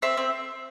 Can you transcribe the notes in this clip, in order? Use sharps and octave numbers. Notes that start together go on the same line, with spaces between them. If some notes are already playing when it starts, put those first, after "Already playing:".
C4 E5
C4